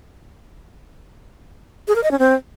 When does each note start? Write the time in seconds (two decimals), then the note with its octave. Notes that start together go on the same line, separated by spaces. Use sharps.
1.88 G#4
1.96 A#4
2.03 D#5
2.11 C#4
2.19 C4